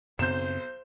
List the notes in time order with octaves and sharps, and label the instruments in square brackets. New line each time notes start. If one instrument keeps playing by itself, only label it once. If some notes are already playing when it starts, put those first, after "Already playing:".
[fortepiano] B1 [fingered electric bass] F#2 C#3 C4 [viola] C5 [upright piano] G6 E7